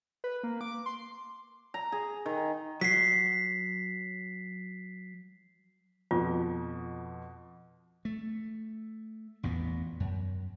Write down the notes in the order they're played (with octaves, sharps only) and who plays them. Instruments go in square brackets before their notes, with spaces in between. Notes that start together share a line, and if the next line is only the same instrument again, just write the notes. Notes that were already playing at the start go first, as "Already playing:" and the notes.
[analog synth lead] B4
A#3
D6
C6
[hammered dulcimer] A#5
G#4
D#3
[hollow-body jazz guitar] F#3 [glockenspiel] B6 C7
[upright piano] F2 B2 [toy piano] F4
[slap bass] A3
A1 E2 A#2 B3
F#2